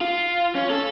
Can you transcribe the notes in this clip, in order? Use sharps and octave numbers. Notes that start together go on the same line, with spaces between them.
F4
C#4
A4